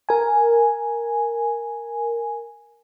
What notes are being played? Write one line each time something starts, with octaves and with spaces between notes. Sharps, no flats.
A#4 G#5